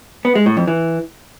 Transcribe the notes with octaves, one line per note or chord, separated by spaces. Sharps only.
B3
G#3
A2
F2
E3